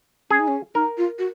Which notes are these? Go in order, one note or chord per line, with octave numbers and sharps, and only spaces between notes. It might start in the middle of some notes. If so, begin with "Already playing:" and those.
C#4 G#4
D#4
C#4
D#4 A#4
F4
F#4